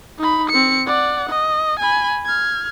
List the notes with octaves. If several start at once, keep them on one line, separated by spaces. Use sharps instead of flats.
D#4 B5
C4 C#7
D5 F#5
D#5
G#5 B5
F6 G#6